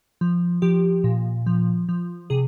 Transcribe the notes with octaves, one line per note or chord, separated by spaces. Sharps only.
F3
F3 G4
A#2
F3
F3
C3 G#4